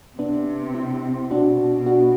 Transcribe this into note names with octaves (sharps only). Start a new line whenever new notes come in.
C3 B3 D4
C4 E4
B2 D4 F#4
D4 F#4